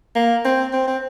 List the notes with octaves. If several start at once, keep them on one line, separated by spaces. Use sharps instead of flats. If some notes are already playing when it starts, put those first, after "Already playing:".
A#3
C4
C4
C4